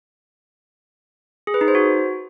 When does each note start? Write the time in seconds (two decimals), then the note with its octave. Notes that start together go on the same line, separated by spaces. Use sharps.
1.47 G#4
1.54 B4
1.61 D#4
1.68 C5
1.75 F#4